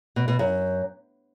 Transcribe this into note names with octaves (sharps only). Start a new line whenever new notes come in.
B2
B2
F#2